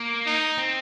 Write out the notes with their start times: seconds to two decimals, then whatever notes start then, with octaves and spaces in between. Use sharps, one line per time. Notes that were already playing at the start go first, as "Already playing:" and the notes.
Already playing: A#3
0.27 D#4
0.58 C4